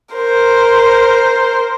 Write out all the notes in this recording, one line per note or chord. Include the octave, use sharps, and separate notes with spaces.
A#4 C5